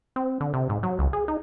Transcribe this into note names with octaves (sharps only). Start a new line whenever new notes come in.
C4
D3
C3
G#2
F#3
C#2
G#4
D#4